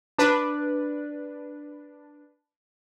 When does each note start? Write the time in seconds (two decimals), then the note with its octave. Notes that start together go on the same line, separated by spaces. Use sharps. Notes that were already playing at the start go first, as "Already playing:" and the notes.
0.18 D4 B4